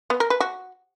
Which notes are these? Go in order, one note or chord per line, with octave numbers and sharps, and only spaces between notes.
B3
A#4
B4
F#4